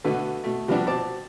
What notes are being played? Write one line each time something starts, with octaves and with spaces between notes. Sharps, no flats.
B2 D3 A3 B4
B2 A3
C3 F3 G3 B3 D4 F#4
B2 C4 A5 D6